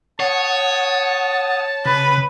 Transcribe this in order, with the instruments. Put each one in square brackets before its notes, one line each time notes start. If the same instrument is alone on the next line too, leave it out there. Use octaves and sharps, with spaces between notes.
[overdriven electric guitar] C#5 [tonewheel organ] F#5 D#6 [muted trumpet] A5
[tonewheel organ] C#3 [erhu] B4